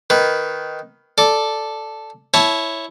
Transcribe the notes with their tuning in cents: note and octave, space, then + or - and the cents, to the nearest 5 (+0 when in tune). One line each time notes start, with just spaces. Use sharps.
D#3 +0 B4 +0
A4 +0 D5 +0
E4 +0 C#5 +0 A5 -25